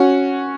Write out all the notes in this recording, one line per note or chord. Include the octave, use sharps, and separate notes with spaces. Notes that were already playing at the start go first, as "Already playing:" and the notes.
Already playing: C#4 F#4